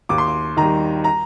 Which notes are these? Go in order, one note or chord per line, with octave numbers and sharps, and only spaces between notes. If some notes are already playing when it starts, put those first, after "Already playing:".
D#2 D6
C6
D6
D#3 G3 A#5
A#5